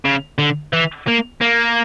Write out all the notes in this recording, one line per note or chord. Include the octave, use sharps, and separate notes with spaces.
C#3
D3
E3
A#3
A#3